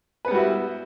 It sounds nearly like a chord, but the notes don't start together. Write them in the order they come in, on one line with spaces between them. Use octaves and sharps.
B4 B3 G3 F#4 E4